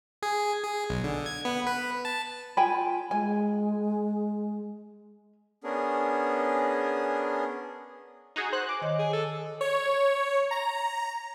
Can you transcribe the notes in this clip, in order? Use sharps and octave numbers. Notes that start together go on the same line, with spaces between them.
G#4
G#4
B1
D3
G#6
B3
B4
A5
F4 G5 G#5 B5
G#3 G#5
B3 C#4 D4 G#4 A#4
D#4 F#4 G#4
C5 F#6
G#5 D6
D#3 C#5 D#5
G#4
A4
C#5
A#5